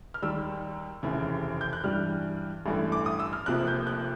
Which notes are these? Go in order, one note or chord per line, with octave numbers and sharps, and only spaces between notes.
F6
D#2 D#3 G3 E6
F1 D#2 C#3 E3
G6
F#6
G2 E3 G3 F6
A1 G2 E3 A3
D6
D#6
E6
F6
F1 F2 C3 F3 A#3 F#6
G6
F#6